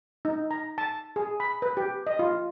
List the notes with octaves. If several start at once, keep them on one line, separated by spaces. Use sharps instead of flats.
D#4
A#5
A5
G#4
B5
B4
G4
D#5
F4